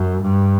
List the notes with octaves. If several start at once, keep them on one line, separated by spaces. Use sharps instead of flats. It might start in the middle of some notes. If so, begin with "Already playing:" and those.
Already playing: F#2
G2